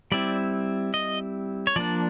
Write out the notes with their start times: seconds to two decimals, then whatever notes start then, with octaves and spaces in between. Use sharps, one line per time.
0.12 G3 C4 E4 D5
0.94 D#5
1.67 C#5
1.76 F3 A#3 D4 D5